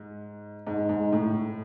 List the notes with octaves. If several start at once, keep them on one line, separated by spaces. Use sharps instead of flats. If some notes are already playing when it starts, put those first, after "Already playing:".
Already playing: G#2
G#2
G#2
A2